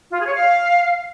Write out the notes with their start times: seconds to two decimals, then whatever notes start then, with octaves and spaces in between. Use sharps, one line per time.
0.12 F4
0.19 G#4
0.27 C#5
0.35 F5